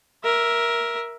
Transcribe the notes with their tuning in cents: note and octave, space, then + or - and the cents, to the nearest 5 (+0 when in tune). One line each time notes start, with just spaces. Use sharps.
A#4 +10 E5 +0